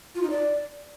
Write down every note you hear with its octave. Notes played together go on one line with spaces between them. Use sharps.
F4
D#4
D5